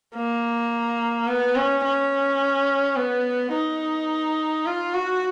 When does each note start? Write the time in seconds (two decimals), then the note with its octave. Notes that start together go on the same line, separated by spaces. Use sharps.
0.15 A#3
1.28 B3
1.56 C#4
1.84 C#4
2.97 B3
3.53 D#4
4.66 F4
4.94 F#4